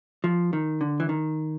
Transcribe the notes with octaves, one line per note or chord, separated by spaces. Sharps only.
F3
D#3
D3
E3
D#3